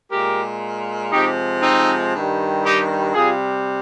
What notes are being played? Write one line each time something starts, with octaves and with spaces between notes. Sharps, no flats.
A#2 G#3 G4 A#4
C3 F3 G#3 D#4 G4
C4 D#4
G2 D#3 G3
D#4 G4
C3 G3 F4 G#4